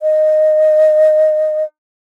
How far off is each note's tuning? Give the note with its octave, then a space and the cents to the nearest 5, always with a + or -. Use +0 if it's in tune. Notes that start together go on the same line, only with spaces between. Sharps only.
D#5 -10